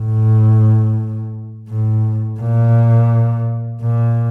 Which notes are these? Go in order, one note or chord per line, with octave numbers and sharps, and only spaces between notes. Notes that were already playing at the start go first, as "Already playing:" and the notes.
Already playing: A2
A2
A#2
A#2